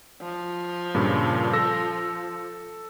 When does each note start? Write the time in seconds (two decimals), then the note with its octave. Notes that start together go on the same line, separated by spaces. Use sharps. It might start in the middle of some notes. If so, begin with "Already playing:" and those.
0.21 F3
0.95 G2 A#2 C#3
1.53 A4 E6 A#6